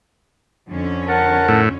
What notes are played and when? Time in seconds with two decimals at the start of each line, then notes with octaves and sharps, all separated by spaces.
0.70 F2 D3 C#4
1.08 A#4 F#5 A5
1.48 A2